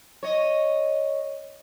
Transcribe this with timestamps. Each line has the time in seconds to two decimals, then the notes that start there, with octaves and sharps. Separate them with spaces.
0.23 C#5 D#5